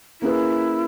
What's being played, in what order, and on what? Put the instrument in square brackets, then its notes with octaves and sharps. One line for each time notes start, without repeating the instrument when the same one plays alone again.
[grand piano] A#3 C#4 G#4 B4 [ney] E4